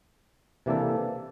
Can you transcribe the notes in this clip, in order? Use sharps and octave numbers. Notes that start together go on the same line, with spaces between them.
C3 E3 A#3 D4 A4